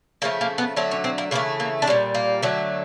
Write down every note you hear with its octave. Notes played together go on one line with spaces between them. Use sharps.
C#3 F3 A3 A#3
A#3
B3
D3 F#3 A3 C4
C#4
C4
A#3
C#3 E3 A3 A#3
A#3
D4
A#2 G3 C#4
A#3
D3 F#3 A3